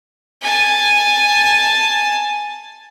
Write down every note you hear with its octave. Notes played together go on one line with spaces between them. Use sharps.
G#5 A5